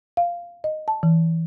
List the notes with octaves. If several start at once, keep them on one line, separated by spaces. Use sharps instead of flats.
F5
D#5
A5
E3